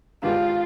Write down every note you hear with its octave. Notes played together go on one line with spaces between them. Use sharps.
G#2 D#3 B3 D4 F4 G4